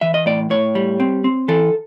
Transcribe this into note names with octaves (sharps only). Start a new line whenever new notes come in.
E3 E5
D#5
A2 D5
A2 C#5
G3
C4
C4
E3 A4